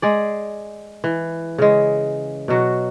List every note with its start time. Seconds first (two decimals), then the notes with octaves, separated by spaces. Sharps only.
0.02 G#3 G#4 D5
1.04 E3
1.58 C#3 G#3
2.48 B2 F#3 F#4